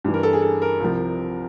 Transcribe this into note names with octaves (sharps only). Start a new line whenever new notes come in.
G2 E3
A#4
A4
G#4
A4
A#4
C2 C3 F3